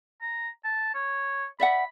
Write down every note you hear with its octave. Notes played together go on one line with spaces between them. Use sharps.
A#5
A5
C#5
D5 E5 F#5 B5